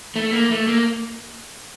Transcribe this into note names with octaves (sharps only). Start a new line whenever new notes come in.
A3
A#3
A3
A#3